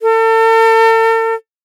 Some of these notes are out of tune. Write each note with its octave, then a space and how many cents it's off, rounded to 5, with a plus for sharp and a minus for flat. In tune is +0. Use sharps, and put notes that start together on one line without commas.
A4 +40